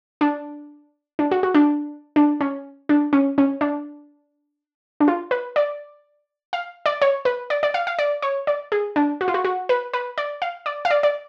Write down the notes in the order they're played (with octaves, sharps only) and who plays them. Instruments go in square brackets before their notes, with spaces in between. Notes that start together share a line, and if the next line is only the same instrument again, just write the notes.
[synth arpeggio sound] D4
D4
F#4
F#4
D4
D4
C#4
D4
C#4
C#4
D4
D4
F4
B4
D5
F5
D5
C#5
B4
D5
D5
F5
F5
D5
C#5
D5
G#4
D4
F#4
F4
F#4
F#4
B4
B4
D5
F5
D5
F5
D5
D5